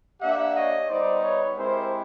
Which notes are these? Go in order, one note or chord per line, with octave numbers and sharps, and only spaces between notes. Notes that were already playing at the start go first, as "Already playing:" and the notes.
A#3 D4 G4 E5 F#5
C#5 D#5
G3 B3 D#4 C5 D5
B4 C#5
G#3 C4 E4 G4 A#4 C5